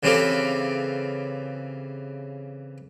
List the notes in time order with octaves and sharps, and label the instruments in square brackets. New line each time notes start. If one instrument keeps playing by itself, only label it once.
[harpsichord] C#3 E3 C4 F4 G4 A4